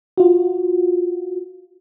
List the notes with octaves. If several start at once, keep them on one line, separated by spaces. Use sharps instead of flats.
F4 F#4